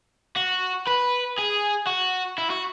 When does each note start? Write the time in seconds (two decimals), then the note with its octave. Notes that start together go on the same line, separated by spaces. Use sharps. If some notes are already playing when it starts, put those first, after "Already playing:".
0.37 F#4
0.87 B4
1.38 G#4
1.87 F#4
2.38 E4
2.50 F#4